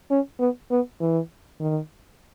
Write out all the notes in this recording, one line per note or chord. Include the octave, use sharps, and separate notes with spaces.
C#4
B3
B3
E3
D#3